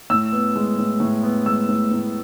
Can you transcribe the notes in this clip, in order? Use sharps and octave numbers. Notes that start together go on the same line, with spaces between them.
A2 E6
B3
G#3
A2
A2
B3
G#3 E6
A2
A2